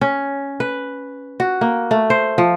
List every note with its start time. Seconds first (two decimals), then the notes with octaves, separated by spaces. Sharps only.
0.01 C#4
0.60 B4
1.40 F#4
1.61 A#3
1.91 A3
2.10 C5
2.38 F3